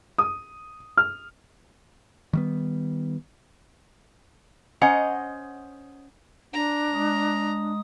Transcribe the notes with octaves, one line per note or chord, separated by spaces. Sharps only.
D#6
F6
D#3 G3 B3
C#4 C5 D#5 F#5 A#5
D4 A#5
G#3 D#6